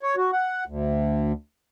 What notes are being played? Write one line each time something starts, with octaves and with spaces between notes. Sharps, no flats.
C#5
F#4
F#5
D2